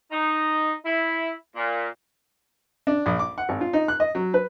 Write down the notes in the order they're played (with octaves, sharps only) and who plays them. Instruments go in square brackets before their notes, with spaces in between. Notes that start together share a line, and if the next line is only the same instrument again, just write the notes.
[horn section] D#4
E4
A#2
[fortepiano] D4
A#1
D6
F#5
G#1
F4
D#4
F#6
D#5
F#3
B4